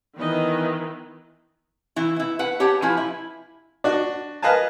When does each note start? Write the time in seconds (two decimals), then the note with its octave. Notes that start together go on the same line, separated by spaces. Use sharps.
0.17 D#3 E3 B3 D#4 D#5
1.96 E3 E4
2.16 B3 E4
2.39 B4 F#5
2.60 G4 C#5 F#5 A5
2.82 F3 E4 B4 G#5
2.97 E4
3.84 D4 F#4
4.42 A#4 B4 D#5 F5 G#5 A5